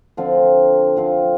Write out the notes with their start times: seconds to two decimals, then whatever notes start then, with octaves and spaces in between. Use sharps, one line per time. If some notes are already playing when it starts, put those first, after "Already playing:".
0.17 D3 F3 C4 F4
0.96 D3 F3 C4 F4